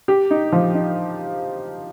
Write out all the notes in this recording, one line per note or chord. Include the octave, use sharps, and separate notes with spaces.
G4
D#4
F3
D#4